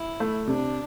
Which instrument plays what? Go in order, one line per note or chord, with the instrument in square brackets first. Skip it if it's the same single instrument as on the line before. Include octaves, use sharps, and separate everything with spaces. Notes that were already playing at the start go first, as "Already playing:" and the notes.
Already playing: [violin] E4
[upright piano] A3
[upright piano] C3 [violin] D4